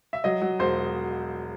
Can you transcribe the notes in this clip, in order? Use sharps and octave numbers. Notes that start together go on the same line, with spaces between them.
E5
F#3 D#5
F#3
E1 C5